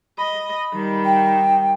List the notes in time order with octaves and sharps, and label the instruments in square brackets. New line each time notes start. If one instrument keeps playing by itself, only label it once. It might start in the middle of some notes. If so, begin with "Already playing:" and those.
[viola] D#5 [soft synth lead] B5
[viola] D#3 G3
[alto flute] G5